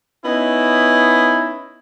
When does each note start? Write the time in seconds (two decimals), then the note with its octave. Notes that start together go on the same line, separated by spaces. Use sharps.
0.25 B3 C#4 D#4 E4